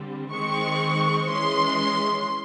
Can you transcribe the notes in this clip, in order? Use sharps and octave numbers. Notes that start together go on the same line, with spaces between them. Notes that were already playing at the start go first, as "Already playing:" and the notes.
Already playing: D3 G3 C4
D#3 G#3 C4 C#6
E3 G#3 C#4 C6